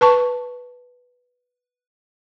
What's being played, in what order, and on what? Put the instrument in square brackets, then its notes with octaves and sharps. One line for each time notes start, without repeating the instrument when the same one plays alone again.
[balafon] B4 A5 C#6